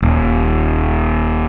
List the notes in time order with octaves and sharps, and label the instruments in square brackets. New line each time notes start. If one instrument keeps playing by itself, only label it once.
[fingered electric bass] D#1